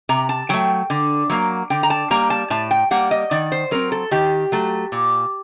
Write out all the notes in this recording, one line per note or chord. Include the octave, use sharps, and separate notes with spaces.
C3 A#5
A5
F#3 A3 G5
D3
F#3 A#3
D3 G5
A#5
A5
G3 A#3 A#5
A5
A2 A5
G5
G3 A#3 F#5
D#5
D#3 D5
C5
F#3 C4 A#4
A4
D#3 G4
F#3 A3
A#2